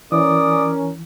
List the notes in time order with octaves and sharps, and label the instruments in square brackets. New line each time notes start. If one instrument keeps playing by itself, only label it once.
[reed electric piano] E3 [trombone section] C#4 A#4 [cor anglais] D5 [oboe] D#6